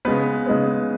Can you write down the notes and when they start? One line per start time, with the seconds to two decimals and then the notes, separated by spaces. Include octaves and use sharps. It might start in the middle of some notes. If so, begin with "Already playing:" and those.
0.05 C#3 G#3 B3 B4
0.46 C#3 G#3 B3